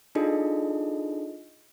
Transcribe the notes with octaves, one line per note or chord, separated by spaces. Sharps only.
D4 D#4 F4 G#4 A4 D#5